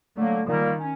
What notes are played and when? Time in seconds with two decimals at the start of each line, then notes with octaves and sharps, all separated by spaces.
0.17 D3 F#3 A3 A#3
0.48 A#2 D#3 G3 A#3
0.79 C#4